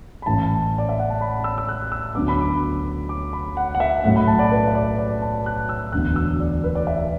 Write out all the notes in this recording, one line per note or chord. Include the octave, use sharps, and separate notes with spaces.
B5
A1 A2 E3 A5
D5
E5
F#5
A5
B5
E6
E6
F#6
E6
D2 D3 F#3 B3 D6
B5
D6
D6
B5
F#5
F#5
E5
B1 A2 A3 F#5
B5
A5
D5
B4
E5
D5
D5
A5
F#6
E6
E1 D2 D3 B3 F#6
E6
D5
B4
D5
E5